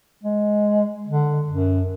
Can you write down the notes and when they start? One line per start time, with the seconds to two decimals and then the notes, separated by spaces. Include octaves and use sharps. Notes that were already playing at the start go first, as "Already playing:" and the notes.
0.23 G#3
1.07 D3
1.47 F#2